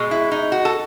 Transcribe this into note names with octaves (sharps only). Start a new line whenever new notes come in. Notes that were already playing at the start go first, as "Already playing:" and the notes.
Already playing: B2 G#3
E4
D#4
F#4
A4